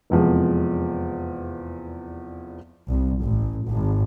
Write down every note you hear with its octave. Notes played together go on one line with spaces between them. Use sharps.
F1 E2 F3 G#3
C2
A1
G#1